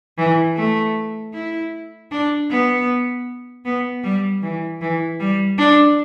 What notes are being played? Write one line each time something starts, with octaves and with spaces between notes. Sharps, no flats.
E3
A3
E4
D4
B3
B3
G3
E3
E3
G3
D4